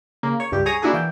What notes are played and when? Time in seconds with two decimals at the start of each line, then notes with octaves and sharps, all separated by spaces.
0.23 C#3 A#3
0.40 C#5
0.52 C#2 G2 G4
0.66 G#4 C#5 A#5 D#6
0.82 A#3 D4 E4 F#4 G#4 A4
0.94 E3 G5